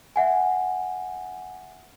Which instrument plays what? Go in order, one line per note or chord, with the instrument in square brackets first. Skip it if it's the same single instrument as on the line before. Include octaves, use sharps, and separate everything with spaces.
[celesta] E5 F#5 G#5